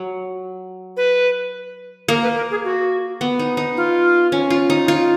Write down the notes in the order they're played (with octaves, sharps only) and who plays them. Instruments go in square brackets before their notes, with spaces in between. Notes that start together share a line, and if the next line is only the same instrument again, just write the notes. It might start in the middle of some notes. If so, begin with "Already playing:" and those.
Already playing: [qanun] F#3
[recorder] B4
[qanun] A#3 [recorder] A#4
[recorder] B4
A#4
G#4
F#4
[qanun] B3
D#4
D#4
[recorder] F4
[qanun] C#4
F4
D#4
F4